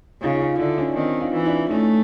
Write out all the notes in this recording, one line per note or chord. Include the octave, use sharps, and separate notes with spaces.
C#3 D#4 F4
D#4 F4
D3 D4 E4
C#4 D#4
D#3 C4 D4
D#4 F4
E3
D4 E4
A3 C#4 D#4